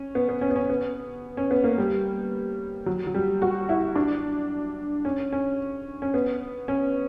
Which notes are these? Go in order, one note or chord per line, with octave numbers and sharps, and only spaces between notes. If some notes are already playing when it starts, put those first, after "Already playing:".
Already playing: C#4
B3
B3
C#4
B3
C#4
B3
C#4
B3
A#3
G3
F#3
F#3
G3
F#4
E4
D4
C#4
C#4
C#4
B3
C#4